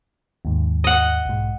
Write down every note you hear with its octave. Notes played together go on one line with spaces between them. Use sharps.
D#2 G#2
D#5 F#5
B1 G#2